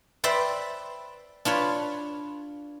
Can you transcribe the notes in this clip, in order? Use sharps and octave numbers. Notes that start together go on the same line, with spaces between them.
B4 C5 D5 E5 G5 C6
D4 F4 B4 C#5